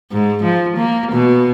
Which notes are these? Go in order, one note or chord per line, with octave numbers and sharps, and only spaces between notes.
G#2
F3
A#3
B2